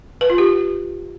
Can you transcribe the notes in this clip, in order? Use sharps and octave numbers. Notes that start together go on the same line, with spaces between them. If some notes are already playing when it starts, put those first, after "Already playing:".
B4
F4
G4